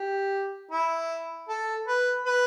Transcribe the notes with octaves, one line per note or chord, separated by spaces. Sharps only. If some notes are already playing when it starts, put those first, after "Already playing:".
Already playing: G4
E4
A4
B4
B4